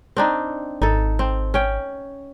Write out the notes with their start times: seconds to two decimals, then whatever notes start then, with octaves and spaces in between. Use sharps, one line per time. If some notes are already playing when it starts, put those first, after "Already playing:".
0.17 C4 D4 D#4
0.82 G#1 D#4 A4
1.19 C4
1.54 C#4 G5